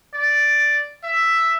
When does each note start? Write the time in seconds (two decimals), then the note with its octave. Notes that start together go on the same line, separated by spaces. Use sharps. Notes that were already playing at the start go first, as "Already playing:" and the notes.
0.14 D5
1.03 E5